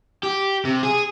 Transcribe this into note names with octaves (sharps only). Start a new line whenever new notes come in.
G4
C3
G#4